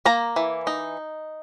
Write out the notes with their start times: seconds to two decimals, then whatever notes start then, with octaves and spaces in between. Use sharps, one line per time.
0.05 A#3 A#5
0.36 E3
0.67 D#4